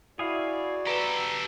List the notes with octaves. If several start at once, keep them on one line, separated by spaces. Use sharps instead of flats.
E4 F#4 G#4 D5 F5
G4 A4 B4 A#5